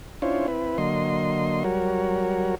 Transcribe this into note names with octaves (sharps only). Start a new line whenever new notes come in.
C#4 D4 E4 F4 C5 C#5
C4 E4 B4
D3 F#3 A#3 D#5 C6
F#3 G3 F#4 A#4 C#5